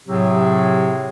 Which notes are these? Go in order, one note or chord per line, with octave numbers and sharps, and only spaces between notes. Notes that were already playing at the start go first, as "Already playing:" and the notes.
A2 C3 F#3 C4 G4 G#4